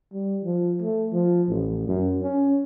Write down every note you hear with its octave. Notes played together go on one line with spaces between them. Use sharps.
G3
F3
A3
F3
A1
F#2
C#4